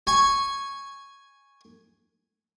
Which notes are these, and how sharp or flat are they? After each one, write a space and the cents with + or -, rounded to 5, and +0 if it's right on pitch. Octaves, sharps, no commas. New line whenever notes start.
G#5 +0 C#6 -5